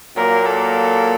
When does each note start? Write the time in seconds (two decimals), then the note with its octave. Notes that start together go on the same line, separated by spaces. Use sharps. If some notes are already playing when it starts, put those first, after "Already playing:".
0.16 A#2 F#3 A#3 A#4
0.46 A4